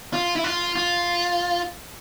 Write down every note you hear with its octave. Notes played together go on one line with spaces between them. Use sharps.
F4
E4
F4
F4